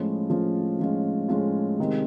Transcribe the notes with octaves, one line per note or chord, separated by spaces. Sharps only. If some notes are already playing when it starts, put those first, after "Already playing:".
Already playing: A2 F3 G#3 C#4 F4
A2 F3 G#3 C#4 F4
A2 F3 G#3 C#4 F4
A2 F3 G#3 C#4 F4
C3 D#3 G#3 C4 D#4